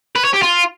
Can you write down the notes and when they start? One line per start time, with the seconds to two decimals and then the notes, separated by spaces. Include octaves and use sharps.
0.16 B4
0.24 C#5
0.33 G4
0.42 F4